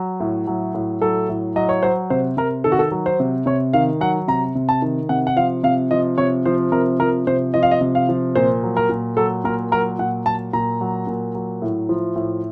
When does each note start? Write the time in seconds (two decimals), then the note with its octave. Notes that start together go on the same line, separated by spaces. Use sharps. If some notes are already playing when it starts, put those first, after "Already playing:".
Already playing: F#3
0.20 A2
0.47 F#3
0.75 A2
1.02 F#3 A4
1.29 A2
1.56 F#3 D#5
1.69 C#5
1.83 F#3 C5
2.10 C3 C5
2.37 C3 A#4
2.64 D#3 A4
2.72 F#4
2.79 A4
2.92 F#3
3.06 C5
3.20 C3
3.46 C3 C#5
3.73 D#3 F5
4.01 F#3 F#5
4.28 C3 A#5
4.55 C3
4.69 A5
4.82 D#3
5.09 C3 F#5
5.27 F#5
5.36 F3 F5
5.63 C3 F5
5.91 F3 D#5
6.18 C3 C#5
6.45 F3 C5
6.72 C3 A#4
7.00 F3 A#4
7.27 C3 C5
7.54 F3 D#5
7.63 F5
7.71 D#5
7.81 C3
7.95 F5
8.09 F3
8.35 A#2 C5
8.63 F#3
8.77 A#4
8.90 A#2
9.17 F#3 A4
9.44 A#2 A#4
9.71 F#3 A#4
9.99 A#2 F#5
10.26 F#3 A5
10.53 A#2 A#5
10.81 F#3
11.07 A#2
11.35 F#3
11.62 A2
11.89 F3
12.16 A2